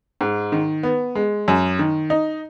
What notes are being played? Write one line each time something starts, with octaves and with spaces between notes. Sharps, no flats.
G#2
D#3
B3
G#3
F#2
D#3
D#4